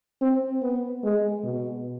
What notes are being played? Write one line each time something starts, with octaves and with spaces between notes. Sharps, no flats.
C4
B3
G#3
B2